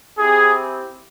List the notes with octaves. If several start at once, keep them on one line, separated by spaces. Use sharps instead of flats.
C4 E4 G4 G#4